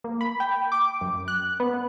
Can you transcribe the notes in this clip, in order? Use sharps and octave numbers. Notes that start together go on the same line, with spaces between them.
A#3
B5
G5
D6
F#2
F#6
B3